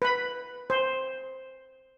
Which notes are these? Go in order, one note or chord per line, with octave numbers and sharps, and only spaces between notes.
B4 B5
C5